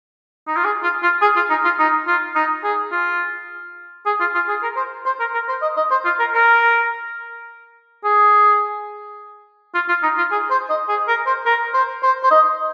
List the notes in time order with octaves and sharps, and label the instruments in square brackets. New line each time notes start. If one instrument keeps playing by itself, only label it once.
[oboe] D#4
F4
G#4
F4
F4
G#4
F4
D#4
F4
D#4
F4
D#4
G#4
F4
G#4
F4
F4
G#4
A#4
C5
C5
A#4
A#4
C5
D#5
D#5
C5
F4
A#4
A#4
G#4
F4
F4
D#4
F4
G#4
C5
D#5
G#4
A#4
C5
A#4
C5
C5
C5
D#5